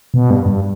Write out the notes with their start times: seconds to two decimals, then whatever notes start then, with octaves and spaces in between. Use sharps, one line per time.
0.14 B2
0.30 G2
0.46 G2